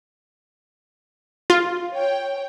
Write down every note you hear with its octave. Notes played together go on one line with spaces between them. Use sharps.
F4
C#5 G5